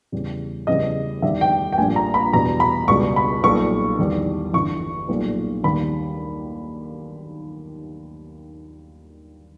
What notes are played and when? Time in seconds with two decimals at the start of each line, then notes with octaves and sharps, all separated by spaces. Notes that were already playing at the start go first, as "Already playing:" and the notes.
0.12 E2 C#3 G3
0.67 E2 C#3 E3 G3 D#5
1.22 E2 D#3 G3 E5
1.41 G5
1.72 G5
1.78 A#1 A#2 G3 G#5
1.96 A#5
2.14 B5
2.33 E2 B2 G3 A#5
2.60 B5
2.88 C#2 B2 G3 C#6
3.16 B5
3.43 B1 A#2 G3 C#6
3.99 E2 D#3 G3
4.53 G1 G2 E3 C#6
5.09 B1 A#2 G3
5.63 D#2 D#3 G3 B5